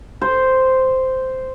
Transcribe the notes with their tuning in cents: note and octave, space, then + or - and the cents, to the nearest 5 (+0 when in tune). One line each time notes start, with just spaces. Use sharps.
C5 -5